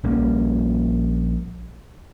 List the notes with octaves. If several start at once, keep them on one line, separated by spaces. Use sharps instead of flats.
A#1 G3 A#3 C#4